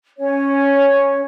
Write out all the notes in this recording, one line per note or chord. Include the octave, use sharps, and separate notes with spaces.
C#4 C#5